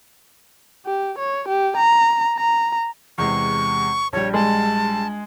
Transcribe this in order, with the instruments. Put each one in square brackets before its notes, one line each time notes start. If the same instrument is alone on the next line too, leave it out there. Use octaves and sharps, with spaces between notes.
[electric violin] G4
C#5
G4
A#5
A#5
[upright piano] E2 C3 G#3 [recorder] C#6
[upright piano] A#1 G3 [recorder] C#5
[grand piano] G#3 [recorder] A5